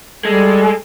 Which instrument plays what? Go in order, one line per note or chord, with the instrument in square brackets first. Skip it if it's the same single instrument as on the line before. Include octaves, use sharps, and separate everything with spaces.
[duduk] G3 [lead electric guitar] G#3 [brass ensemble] A4